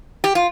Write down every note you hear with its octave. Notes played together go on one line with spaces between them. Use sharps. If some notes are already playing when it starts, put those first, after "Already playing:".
G4
F4